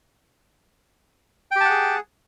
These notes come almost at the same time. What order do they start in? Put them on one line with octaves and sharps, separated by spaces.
G5 G4 A5 F#5 G#4